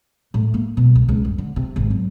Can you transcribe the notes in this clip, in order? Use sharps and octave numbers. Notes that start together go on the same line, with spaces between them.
A2
A#3
B2
C2
C#2
G2
D3
C3
G#1
F#2